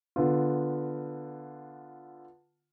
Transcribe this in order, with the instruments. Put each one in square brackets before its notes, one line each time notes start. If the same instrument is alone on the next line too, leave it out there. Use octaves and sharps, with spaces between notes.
[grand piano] D3 B3 F4